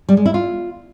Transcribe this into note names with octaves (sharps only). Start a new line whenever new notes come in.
G3
G#3
E4
F4